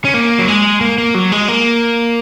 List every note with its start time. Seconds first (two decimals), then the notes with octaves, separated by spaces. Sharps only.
0.05 C#4
0.14 A#3
0.39 F#3
0.48 G#3
0.81 A#3
0.98 A#3
1.15 F#3
1.32 G#3
1.48 A#3